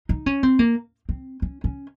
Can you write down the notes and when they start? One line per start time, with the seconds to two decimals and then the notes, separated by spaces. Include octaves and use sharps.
0.09 D#4
0.26 C#4
0.43 C4
0.59 A#3
1.09 C4
1.42 C#4
1.64 C#4